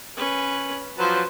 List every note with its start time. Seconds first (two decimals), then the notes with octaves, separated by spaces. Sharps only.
0.17 C#4 B4
0.98 F3 F#3 B4 C5 A5